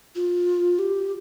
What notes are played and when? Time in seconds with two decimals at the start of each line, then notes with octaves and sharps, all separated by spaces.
0.15 F4
0.79 G4